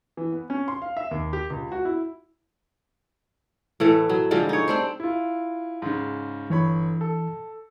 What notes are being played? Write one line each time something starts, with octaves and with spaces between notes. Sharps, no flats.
E3
B3
C#4
C6
F5
E5
D#2
G4
C#2
F#4
E4
A2 E3 A3
F#3
D3 F3 G3 G#3
D#4 C#5
C4 D4 C5
E4 F4
G#2 C#3
G1 E3 C#5 B5
A4